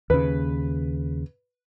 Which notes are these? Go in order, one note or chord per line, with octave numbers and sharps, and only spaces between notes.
D#2 C#3 B4